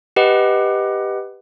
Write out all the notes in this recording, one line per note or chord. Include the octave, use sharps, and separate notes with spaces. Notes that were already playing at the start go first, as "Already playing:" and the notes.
G4 B4 D#5 F#5